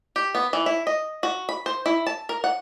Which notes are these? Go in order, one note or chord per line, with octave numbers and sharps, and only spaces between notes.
G4
B3
E3
E4
D#5
F#4
B5
C5
E4
A5
A#4
F#5